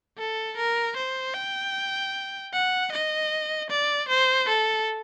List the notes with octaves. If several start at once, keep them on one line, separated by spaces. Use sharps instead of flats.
A4
A#4
C5
G5
F#5
D#5
D5
C5
A4